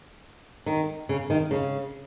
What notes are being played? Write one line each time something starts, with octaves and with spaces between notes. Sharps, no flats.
D#3
C#3
D#3
C#3